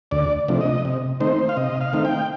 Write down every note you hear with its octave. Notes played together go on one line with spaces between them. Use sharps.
D2 D5
C3 F3 A3 D4
D#5
C3
D#3 A3 C4 D#4 C5
F5
C3 D#5
F5
D#3 A3 C4 D#4
G5